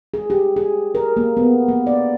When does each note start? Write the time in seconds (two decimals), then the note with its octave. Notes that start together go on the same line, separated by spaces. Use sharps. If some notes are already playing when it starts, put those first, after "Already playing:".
0.14 G#4
0.30 G4
0.56 G#4
0.95 A#4
1.17 A#3
1.37 B3
1.68 A#3
1.87 D5